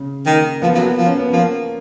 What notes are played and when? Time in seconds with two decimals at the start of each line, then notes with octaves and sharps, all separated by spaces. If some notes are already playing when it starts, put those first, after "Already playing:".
Already playing: C#3
0.26 D#3 A#3
0.62 F3 B3
0.72 F3 A#3
0.79 F#3
0.83 B3
0.97 F3
1.06 C#4
1.19 B3
1.33 F3 A#3